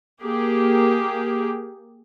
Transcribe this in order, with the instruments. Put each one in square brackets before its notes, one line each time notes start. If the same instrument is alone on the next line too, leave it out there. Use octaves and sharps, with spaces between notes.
[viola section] A#3 G4 G#4